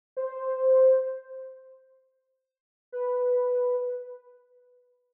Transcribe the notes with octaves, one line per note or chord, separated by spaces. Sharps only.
C5
B4